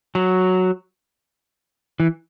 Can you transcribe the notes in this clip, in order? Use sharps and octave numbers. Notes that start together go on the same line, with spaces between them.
F#3
E3